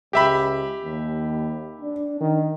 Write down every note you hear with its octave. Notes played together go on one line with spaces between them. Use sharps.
C#2 G4 E5 B5
D#2
D4
D#3